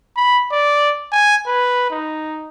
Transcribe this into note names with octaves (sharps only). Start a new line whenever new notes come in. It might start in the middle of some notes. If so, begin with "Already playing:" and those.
B5
D5
G#5
B4
D#4